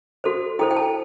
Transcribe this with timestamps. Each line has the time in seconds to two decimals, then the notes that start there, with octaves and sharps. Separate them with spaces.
0.24 F#4 A4 C5
0.59 E4 A4 C5 G5
0.71 G5
0.77 A5